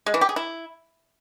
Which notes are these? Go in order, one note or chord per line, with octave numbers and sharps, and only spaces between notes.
G#3
E3
G4
G#4
E4